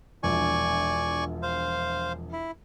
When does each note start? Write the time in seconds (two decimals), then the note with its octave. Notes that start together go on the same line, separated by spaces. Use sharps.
0.23 E1 A#1 D5 G#5 C#6
1.42 C5 F5
2.33 E4